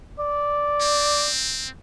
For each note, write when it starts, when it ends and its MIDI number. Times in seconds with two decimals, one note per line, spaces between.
0.19 1.28 74
0.81 1.68 60